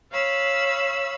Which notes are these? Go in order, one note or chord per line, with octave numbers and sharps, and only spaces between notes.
C#5 F5 B5 E6